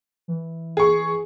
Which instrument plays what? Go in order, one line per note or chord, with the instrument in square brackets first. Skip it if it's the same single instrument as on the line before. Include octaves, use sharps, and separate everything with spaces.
[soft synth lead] E3
[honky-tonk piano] G#4 C#6